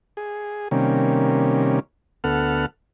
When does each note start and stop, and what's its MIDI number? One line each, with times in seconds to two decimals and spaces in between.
0.17 0.68 68
0.71 1.79 48
0.71 1.79 51
0.71 1.79 55
0.71 1.79 58
0.71 1.79 61
2.24 2.66 38
2.24 2.66 59
2.24 2.66 69
2.24 2.66 78
2.24 2.66 89